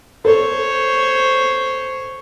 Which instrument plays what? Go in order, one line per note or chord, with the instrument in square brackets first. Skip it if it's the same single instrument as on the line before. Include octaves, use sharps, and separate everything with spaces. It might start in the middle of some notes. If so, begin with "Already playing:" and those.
[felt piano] A4 [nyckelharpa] C5 C#5